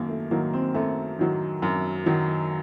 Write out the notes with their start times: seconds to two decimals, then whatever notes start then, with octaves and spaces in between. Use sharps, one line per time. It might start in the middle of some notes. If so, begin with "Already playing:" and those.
Already playing: F#2 D#3 A#3
0.09 A3
0.31 D#3 F#3 A#3
0.53 C4
0.74 F#2 A3
1.19 D#3 F#3
1.62 F#2
2.06 D#3 F#3